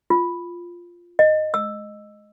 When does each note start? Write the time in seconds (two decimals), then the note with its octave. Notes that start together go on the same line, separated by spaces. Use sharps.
0.10 F4
1.19 D#5
1.54 E6